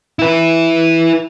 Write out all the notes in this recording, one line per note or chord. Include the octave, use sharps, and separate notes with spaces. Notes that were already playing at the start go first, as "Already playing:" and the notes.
E4 B4